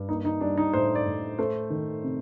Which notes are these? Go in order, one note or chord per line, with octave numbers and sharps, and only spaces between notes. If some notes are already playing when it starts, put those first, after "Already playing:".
Already playing: G2
A#3 D#4
D#4
G3 D4
D#4
A2 C5
D5
A2
A3 C5
D#3
C3